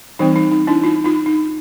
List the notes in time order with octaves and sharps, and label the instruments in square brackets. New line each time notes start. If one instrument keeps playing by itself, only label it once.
[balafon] E3 G3 C4 D#4
D#4
D#4
D4 E4
D#4 F4
D#4 F4
D#4